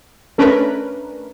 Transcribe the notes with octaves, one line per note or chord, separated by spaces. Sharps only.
A3 C#4 D4 A#4 B4